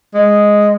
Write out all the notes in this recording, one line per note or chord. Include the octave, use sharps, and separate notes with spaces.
G#3